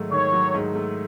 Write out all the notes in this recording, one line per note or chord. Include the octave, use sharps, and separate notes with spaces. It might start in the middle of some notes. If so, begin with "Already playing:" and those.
Already playing: G#2 D#3 F#3 A3
D#3 C#5
F#3
G#2
A3